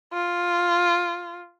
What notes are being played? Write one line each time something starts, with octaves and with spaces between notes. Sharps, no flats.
F4